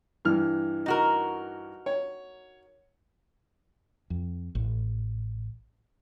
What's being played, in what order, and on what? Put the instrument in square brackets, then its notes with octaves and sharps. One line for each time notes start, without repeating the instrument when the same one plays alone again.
[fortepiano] G2 E3 F6
[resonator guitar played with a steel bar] D#4 F#4 A#4
[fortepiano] C#5
[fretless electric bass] F2
A1